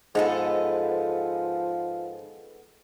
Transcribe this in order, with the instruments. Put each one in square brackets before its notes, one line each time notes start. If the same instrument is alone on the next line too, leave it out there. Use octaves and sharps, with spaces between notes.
[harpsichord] G#2 [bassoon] F3 [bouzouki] G#3 B3 A4